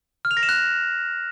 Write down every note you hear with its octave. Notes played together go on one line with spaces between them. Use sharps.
F6
F7
A#6
E7
F#6